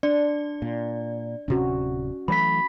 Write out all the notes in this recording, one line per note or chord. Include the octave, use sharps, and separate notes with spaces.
D4 D5
A#2
D1 C3 C#4 F#4
E3 F#3 A3 B5 B6